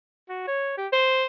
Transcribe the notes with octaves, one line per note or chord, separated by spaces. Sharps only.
F#4
C#5
G4
C5